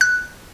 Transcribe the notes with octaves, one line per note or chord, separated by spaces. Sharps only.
F#6